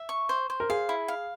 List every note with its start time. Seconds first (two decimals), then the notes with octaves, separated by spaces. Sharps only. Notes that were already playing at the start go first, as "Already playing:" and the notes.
Already playing: E5
0.09 C#6
0.29 C5
0.50 C5
0.60 A#4
0.70 G#4 F5
0.89 E4
1.08 F5